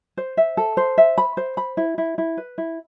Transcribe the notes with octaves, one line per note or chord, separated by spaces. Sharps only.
C5
E5
A4
C5
E5
B5
C5
B5
E4
E4
E4
B4
E4